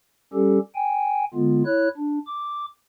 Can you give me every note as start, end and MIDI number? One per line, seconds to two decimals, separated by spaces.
0.33 0.59 55
0.33 0.59 61
0.33 0.59 67
0.33 0.59 69
0.75 1.25 79
0.75 1.25 80
1.34 1.63 50
1.34 1.63 56
1.34 1.63 59
1.34 1.63 65
1.65 1.88 64
1.65 1.88 73
1.65 1.88 90
1.98 2.19 62
2.27 2.66 86